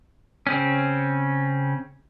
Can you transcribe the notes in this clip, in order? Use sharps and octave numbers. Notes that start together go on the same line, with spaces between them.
C#3 C4 C#4